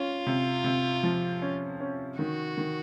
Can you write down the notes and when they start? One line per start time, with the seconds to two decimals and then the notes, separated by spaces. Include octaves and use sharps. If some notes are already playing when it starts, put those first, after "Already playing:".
Already playing: C#4 F4
0.27 C3
0.64 C3
1.03 F3
1.42 C#4
1.80 C#4
2.19 D#3 F#4
2.58 D#3